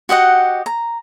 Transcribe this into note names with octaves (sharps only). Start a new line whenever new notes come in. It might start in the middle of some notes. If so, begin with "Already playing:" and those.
F#4 G4 D#5 F#5
A#5